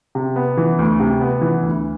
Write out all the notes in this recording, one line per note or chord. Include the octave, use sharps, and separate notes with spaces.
C3
B3
E3
D2
C3
B3
E3
D2